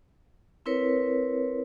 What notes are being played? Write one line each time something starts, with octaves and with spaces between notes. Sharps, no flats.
C4 E4 A#4 B4 C#5